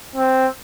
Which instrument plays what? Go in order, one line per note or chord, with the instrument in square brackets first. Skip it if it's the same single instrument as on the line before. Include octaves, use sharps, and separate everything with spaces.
[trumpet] C4